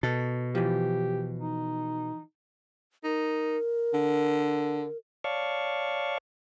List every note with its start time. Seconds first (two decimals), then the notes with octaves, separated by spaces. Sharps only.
0.03 B2 A4
0.55 E3 F3 G4
1.39 D#4
3.04 D#4 A#4
3.94 D3
5.24 C#5 D5 F5 A5 C#6